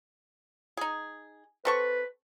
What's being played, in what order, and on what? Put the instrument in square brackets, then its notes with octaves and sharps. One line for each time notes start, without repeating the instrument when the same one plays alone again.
[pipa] D#4 G#4
[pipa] C4 A4 C#6 [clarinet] B4